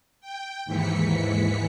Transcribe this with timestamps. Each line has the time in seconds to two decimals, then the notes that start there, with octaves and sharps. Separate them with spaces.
0.21 G5
0.65 D#2 G#2 E3 B6 C#7